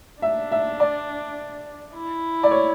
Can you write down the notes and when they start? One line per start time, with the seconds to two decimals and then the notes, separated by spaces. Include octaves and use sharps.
0.22 D4 E5
0.52 E5
0.80 D5
1.95 E4
2.43 D5
2.51 C#5